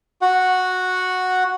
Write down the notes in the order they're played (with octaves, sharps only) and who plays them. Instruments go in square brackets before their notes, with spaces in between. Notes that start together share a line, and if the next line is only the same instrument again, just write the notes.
[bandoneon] F#4 F#5